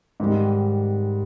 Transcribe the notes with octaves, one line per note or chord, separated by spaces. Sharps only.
G#2 D#3 G3